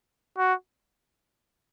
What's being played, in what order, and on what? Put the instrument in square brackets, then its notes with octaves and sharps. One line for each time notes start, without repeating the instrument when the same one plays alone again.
[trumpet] F#4